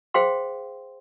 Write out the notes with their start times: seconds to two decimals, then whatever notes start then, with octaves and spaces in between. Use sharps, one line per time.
0.14 G#4 C5 F5 G5 C6